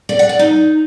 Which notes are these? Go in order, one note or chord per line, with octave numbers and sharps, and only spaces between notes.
D5
F#5
D5
D#4